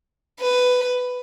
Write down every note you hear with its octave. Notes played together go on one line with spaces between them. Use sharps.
B4